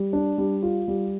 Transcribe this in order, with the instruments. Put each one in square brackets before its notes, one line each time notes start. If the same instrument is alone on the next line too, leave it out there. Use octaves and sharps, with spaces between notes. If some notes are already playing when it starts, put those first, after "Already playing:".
Already playing: [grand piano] G3
D4
G3
F4
G3